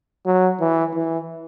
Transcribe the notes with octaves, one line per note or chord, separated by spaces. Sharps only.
F#3
E3
E3